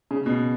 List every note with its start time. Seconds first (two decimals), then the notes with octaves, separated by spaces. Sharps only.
0.11 C#3
0.26 B2